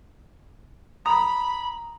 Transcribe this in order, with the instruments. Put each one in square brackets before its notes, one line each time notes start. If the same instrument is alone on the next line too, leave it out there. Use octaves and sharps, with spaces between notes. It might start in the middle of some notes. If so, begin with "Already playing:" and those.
[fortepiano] A#5 [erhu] B5 [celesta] D#6 F7